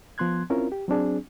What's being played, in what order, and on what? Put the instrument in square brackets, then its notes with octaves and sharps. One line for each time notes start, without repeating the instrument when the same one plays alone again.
[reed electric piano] F3 B3 C6 F#6 G#6
C4 C#4 E4 F4 A#4
G4
F#3 C4 D4 G#4